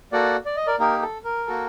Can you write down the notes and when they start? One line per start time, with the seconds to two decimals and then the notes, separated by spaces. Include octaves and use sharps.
0.12 A#3 F#4 A4 D5 F#5
0.46 D5
0.56 D#5
0.67 A#4 D5
0.79 A#3 D#4 G4 A#4
1.02 A4
1.24 A#4
1.47 A#3 F#4 A4